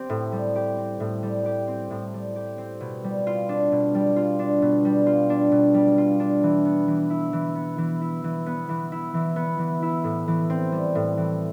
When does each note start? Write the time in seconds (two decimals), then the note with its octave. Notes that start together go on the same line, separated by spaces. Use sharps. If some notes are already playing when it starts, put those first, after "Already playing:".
Already playing: C4 G4
0.10 A2
0.32 G3
0.56 G4
0.78 C4
1.00 A2
1.23 G3
1.46 G4
1.67 C4
1.90 A2
2.14 G3
2.36 G4
2.58 C4
2.80 B2
3.04 G3
3.27 F4
3.49 D4
3.72 B2
3.95 G3
4.16 F4
4.39 D4
4.62 B2
4.85 G3
5.07 F4
5.30 D4
5.52 B2
5.74 G3
5.98 F4
6.20 D4
6.43 E3
6.65 B3
6.88 E3
7.10 E4
7.33 E3
7.55 B3
7.78 E3
8.01 E4
8.24 E3
8.46 B3
8.69 E3
8.92 E4
9.14 E3
9.36 B3
9.59 E3
9.82 E4
10.04 A2
10.28 E3
10.50 C4
10.72 G3
10.95 A2
11.17 E3